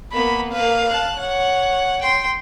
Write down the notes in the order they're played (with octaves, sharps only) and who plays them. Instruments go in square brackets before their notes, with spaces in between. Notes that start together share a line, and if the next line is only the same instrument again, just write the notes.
[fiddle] A#3 B3 [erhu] B5
[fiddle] A#3 B4 [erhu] F5
[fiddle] A5 F#6
[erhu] C#5 [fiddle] F#5
[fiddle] G5 C6